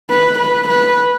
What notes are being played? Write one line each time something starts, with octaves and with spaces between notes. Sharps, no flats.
B4
B4
B4